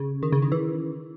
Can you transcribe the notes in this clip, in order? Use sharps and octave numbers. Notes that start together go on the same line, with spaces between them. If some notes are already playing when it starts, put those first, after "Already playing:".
Already playing: C#3
D#3
C#3
D#3
E3